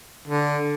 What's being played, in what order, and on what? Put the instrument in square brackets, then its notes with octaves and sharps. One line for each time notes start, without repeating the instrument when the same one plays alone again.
[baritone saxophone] D3